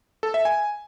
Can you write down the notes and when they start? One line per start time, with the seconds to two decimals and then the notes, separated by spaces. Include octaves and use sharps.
0.23 A4
0.34 E5
0.45 G#5